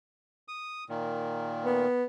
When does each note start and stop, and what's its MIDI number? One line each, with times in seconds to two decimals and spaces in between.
0.48 0.84 87
0.89 1.86 46
0.89 1.86 51
1.65 2.04 59